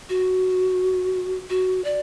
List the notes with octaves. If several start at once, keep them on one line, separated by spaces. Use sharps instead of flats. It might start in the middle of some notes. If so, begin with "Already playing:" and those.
F#4
F#4
D5